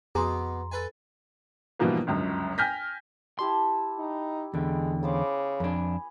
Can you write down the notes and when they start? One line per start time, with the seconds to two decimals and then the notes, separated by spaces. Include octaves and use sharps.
0.15 F2 B2 B3 G#4 A#5 C6 D6
0.72 A4 B4 G#5
1.79 G2 B2 E3 F3 A#3 B3
2.07 G1 C#2 F#2
2.58 G5 G#5 F6 G6 A#6 B6
3.39 E4 G4 A5 C6
3.99 D#4
4.54 E2 D3 G#3 G5
5.03 C#3 B3 C5 D6
5.60 F2 D4 B4 G#5